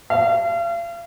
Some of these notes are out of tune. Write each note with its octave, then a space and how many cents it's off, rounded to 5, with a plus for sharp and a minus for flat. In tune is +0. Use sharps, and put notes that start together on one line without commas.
F5 -40